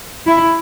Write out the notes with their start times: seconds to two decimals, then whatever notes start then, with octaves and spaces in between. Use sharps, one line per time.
0.27 E4